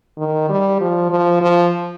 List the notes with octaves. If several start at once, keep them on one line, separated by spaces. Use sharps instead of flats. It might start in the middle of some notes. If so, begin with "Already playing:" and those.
D#3
G3
F3
F3
F3